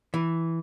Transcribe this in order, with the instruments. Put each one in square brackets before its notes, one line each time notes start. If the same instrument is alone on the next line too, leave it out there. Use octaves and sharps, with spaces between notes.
[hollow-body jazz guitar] E3